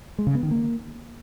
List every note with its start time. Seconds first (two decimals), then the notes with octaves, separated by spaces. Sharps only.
0.18 G#3
0.27 C#3
0.35 B3
0.43 D#3
0.51 A#3